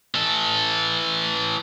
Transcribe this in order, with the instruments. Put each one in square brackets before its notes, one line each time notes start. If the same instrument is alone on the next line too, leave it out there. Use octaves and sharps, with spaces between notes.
[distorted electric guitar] E3 A4